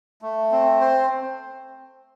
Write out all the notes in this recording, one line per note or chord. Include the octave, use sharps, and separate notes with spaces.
A3
C4
C5